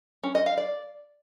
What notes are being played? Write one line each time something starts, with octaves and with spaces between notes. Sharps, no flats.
C#4
D#5
F5
D5